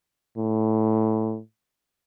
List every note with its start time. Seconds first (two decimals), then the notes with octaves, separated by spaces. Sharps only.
0.37 A2